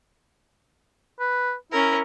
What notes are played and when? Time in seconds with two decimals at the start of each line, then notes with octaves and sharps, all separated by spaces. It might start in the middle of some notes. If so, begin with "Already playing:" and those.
1.20 B4
1.72 C#4 E4 A#4